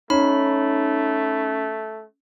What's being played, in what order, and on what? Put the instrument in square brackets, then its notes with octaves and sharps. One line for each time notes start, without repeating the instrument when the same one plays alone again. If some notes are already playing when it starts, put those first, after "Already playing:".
[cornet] A3 [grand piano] C#4 [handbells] D#4 B5